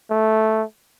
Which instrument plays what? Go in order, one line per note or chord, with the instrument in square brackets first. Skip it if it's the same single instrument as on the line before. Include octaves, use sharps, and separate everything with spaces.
[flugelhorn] A3